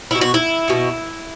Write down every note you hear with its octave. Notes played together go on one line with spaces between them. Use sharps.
B2 B3 E4
F#4
E4
B2 B3